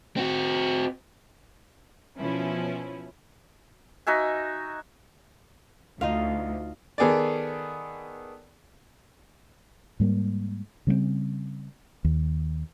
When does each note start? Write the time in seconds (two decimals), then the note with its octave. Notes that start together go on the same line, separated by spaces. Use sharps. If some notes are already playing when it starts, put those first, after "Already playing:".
0.17 C4 F#4
2.17 B2 F3 C#4 E4
4.07 D#4 F#4 E5 G#5
6.01 D2 D#4 F4 F5
6.98 D#3 B3 G#4 A4 D5
10.00 G#2 G3 A#3
10.87 C#3 G3 G#3 C4
12.05 D#2